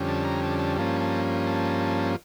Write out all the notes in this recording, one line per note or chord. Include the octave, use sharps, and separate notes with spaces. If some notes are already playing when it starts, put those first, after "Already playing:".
Already playing: F2 D3 G3 C#4
A5
A#5
A5
A5
G2 F3 A#3 C#4 A5
A5
A5